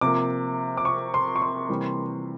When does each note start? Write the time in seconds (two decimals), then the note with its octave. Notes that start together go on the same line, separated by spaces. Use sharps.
0.01 C3 F3 A#3 D6
0.77 D6
0.85 C#6
1.14 C6
1.36 C#6
1.42 C6
1.69 C3 E3 G3 A#3